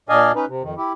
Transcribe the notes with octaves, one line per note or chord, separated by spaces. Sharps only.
A#2 D4 D5 D#5 F5 G#5
C#4 D#4 B4
C3
F2 D#3
E4 G4